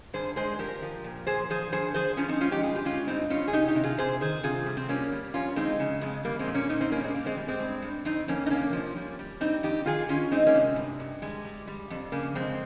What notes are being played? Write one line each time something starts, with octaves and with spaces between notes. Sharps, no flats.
G2 G#4 C5
G#3 G#4 C5
F3 G4 A#4
F3
A#2
A#2 G#4 C5
F3 G#4 C5
G2 G#4 C5
F3 G#4 C5
F3 C#4 F4
C4 D#4
G#3 C#4 F4
D#4 G4
G2 F4 G#4
G4
G#3 C#4 F4
G2 C4 D#4
G2 C#4 F4
G#4
C3 D#4 G4
D#4 G4
C3
F4 G#4
C3 G#4 C5
D#3 G#4 C5
C3 F4 G#4
G3
C4
G3 A#3 C#4
G3
F2 C#4 F4
G#3 C4 D#4
C#3
F2 G#3
G3 A#3
G#3 C4
A#2
A#3 C#4
A#2 C4 D#4
C4 D#4
G3 A#3 C#4
G#3 C4
G3 A#3
G#3 C4
G3
G#3 C4
G2
G2
F2 C4 D#4
F2 A#3 C#4
D#4
C3 A#3 C#4
F3
G3
G3
G3 C4 D#4
F2 D#4 G4
D#3 F4 G#4
D#3 C#4 F4
G#3 C4 D#4
A#3 C#4
C3
G2
G2
G3 G#3
G3
G3
F2
C#3 A#3
F2 G#3 C4